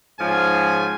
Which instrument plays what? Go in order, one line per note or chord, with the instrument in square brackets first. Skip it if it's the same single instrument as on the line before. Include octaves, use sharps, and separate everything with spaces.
[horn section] G#2 F3 C#4 G#5